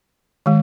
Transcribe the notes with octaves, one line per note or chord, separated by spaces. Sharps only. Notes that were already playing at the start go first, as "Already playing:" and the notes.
D#3 G#3